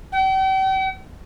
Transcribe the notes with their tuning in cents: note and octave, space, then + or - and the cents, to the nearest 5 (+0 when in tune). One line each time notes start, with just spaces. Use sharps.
G5 -40